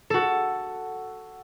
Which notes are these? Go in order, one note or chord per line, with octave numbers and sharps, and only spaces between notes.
F#4 A4